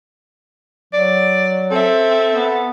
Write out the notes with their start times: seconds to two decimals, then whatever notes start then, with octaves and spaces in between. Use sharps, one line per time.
0.93 F#3 D5
1.72 C4 A4 E5
2.32 B3